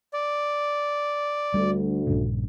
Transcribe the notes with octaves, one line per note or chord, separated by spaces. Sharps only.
D5
D2 G3
A#1 G2 C#3